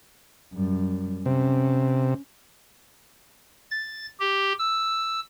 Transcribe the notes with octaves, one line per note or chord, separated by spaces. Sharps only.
F#2 G3
C3 C#4
A6
G4
E6